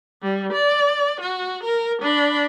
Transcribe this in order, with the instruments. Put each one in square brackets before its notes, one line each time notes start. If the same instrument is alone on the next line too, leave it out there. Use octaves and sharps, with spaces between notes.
[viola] G3
D5
F#4
A#4
D4 B5